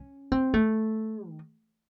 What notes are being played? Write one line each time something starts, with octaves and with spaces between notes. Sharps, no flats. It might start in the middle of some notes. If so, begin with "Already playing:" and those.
Already playing: C#4
C4
A3
D#3